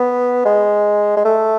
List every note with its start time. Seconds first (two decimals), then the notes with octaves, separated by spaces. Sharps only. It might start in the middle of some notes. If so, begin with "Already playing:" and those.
Already playing: B3
0.45 G#3
1.17 G#3
1.25 A3